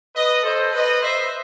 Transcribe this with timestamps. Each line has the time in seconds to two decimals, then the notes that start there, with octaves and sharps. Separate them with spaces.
0.14 B4 D#5
0.42 A4 C5
0.72 B4 D#5
1.01 C5 E5